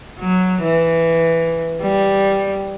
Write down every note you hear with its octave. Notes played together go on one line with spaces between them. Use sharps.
F#3
E3
G3